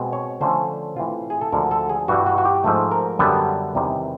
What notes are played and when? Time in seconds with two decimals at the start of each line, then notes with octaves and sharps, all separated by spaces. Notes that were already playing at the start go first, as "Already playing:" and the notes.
Already playing: B2 G#3 C4
0.13 C#5
0.41 D3 F3 A3 C#4 C5
0.96 A2 E3 A3 C4 F4
1.30 G#4
1.41 A4
1.52 D2 D3 F3 G#3 A#4
1.71 A4
1.89 G#4
2.08 G2 E3 G3 F#4
2.26 F#4
2.38 F#4
2.45 G4
2.64 G#2 F3 A3
2.91 A#4
3.19 F#2 D3 G3 B3
3.75 E2 C3 D#3 G3